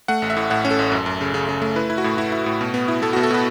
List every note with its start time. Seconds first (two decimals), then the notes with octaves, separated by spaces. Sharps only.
0.08 A3 F#5
0.22 A1
0.30 E5
0.37 A2
0.50 A2 F#5
0.65 C#4
0.71 A4
0.79 A1
0.92 F#2
1.06 F#2
1.21 C#3
1.34 C#3
1.49 C#3
1.62 A3
1.76 E4 B4
1.90 E4
1.98 F#4
2.04 A2
2.18 E4
2.32 E4
2.46 A2
2.61 B2
2.74 B3
2.88 E4
3.02 B3 A4
3.13 F#4
3.16 B2
3.23 A4
3.31 B2 B4